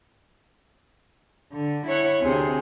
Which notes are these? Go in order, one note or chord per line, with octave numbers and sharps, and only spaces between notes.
D3
E4 C#5 F#5
D2 C3 G#4